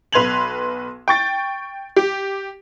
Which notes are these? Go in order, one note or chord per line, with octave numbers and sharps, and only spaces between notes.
B1 B4 C6 G#6 F7 F#7
G5 C#6 A6
G4